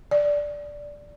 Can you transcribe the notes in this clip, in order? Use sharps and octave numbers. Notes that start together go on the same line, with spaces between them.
D5